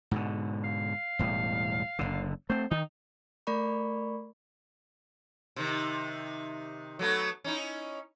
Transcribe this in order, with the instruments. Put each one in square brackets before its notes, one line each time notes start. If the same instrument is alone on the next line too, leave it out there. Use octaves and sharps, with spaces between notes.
[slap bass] G#2 B2 D3
[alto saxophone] F5
[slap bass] E1 A2 G3
F#1 B1 D3
[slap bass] A3 C4 [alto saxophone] C5
[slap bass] D#3 [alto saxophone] D#4
[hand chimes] A3 A#4 D5 B5 C#6
[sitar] C3 D#3
F#3 A3 B3
C#4 D#4 E4